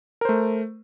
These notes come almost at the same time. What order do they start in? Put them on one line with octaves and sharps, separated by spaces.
A#4 C5 A3